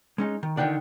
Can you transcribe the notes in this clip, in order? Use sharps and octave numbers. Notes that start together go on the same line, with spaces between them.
G#3 C#4 D#4
D#3
D3 D#3 D5 F#5 G5